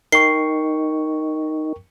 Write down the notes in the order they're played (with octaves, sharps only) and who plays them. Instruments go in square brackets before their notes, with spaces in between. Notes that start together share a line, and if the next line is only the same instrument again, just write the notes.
[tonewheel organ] D#4 [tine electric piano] A#4 G5 C#6 [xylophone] C7